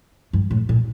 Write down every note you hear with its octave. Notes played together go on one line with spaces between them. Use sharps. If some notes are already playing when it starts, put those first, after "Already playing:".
G2
A2
A#2